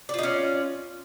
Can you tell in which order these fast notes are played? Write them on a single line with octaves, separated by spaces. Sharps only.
D5 F4 D#4 C#4